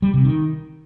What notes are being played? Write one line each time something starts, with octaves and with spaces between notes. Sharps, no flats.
G3
C3
D#3